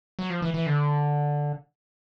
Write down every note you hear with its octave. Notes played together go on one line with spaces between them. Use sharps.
F#3
F3
E3
E3
D3